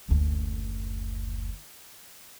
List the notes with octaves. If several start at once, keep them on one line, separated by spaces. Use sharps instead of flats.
F#1 D2